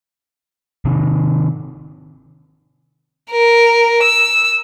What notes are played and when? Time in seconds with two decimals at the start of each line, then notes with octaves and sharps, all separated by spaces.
0.85 C3 D#3
3.31 A#4
4.03 E6